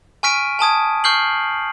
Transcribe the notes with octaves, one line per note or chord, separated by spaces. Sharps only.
G#5 C#6 F6 B6 D7 D#7
G#5 A5 D#6 G#6
C#6 F6 G6 C7 F#7